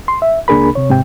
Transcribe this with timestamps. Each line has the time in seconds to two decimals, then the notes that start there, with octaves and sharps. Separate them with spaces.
0.08 C6
0.22 E5
0.48 C#2 A#3 D4 G#4 A#4 B5
0.75 C3 C#5
0.90 G#2 C3 G5